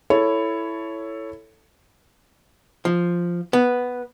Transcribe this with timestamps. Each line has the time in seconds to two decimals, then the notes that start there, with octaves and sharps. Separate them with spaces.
0.10 E4 A4 C#5
2.85 F3
3.53 B3